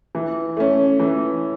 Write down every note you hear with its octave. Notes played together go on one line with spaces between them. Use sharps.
E3
A3 C#4
E3